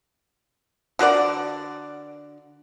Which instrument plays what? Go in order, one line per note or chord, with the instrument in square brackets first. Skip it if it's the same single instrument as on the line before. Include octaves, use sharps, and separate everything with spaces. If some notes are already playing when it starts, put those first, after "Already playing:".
[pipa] D3 F#4 A#4 D5